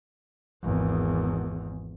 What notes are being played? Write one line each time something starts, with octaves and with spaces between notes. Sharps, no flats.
G#1 E2